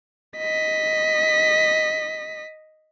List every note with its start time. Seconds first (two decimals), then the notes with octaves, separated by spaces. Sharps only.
0.39 D#5 B6